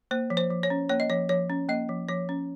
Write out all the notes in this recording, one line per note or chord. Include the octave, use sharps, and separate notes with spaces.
A#3 C5
F3
C5
F3
C#5
C#4
A#3 C#5
D#5
F3 C#5
F3 C#5
C#4
A#3 D#5
F3
F3 C#5
C#4